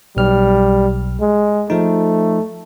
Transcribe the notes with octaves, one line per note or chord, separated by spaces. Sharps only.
B1 G3 F6
G#3
F3 A3 D#4